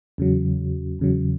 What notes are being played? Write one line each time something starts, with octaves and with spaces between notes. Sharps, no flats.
E2 C#3 F#3
E2 C#3 F#3